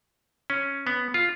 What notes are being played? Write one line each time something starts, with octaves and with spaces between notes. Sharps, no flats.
C#4
B3
F4